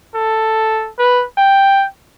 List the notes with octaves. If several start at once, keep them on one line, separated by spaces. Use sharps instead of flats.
A4
B4
G5